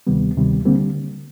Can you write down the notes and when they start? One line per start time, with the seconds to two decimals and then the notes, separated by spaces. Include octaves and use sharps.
0.07 D2 C3 D#3 G3 B3
0.36 D2 C3 D#3 G3
0.65 D3 G3 A#3 C4